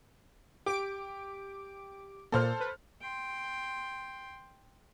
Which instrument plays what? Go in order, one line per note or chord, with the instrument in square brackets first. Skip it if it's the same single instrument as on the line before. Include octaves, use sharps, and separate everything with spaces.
[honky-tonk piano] G4 [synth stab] D6 D7
[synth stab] A#2 A#3 [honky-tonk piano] A4 C5 F6
[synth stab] B4
[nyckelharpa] G5 C6